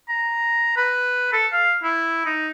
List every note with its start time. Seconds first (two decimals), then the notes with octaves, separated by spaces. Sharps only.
0.09 A#5
0.76 B4
1.33 A4
1.52 F5
1.83 E4
2.25 D#4